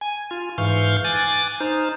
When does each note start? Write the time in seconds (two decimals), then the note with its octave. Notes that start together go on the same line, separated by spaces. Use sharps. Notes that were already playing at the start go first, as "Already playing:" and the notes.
0.01 G#5
0.31 F4
0.58 G#2 E3 F5 C#6 F6 G6
1.04 G#5 D6 F#6 A6
1.60 D#4 C5 F6